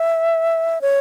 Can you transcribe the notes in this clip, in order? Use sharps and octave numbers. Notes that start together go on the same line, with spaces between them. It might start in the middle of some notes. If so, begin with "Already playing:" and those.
Already playing: E5
C#5